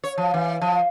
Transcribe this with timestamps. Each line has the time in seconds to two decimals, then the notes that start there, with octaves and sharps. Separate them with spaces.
0.04 C#5
0.18 F3
0.34 E3
0.61 F3